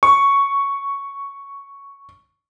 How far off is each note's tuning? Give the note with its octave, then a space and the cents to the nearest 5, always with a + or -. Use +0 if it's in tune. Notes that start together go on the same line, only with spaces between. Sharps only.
C#6 +5